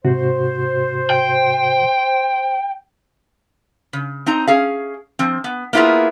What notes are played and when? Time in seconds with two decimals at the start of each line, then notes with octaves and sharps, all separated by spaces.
0.05 G#2 C3 F#4 C5
1.10 G5
3.93 C#3
4.26 C4 D#4 A#5
4.47 C#4 G#4 F5
5.19 F3 C4
5.44 B3
5.73 A#3 B3 E4 F4 G#4 A#4